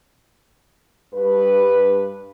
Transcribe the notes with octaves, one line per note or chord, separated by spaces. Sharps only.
G2 B4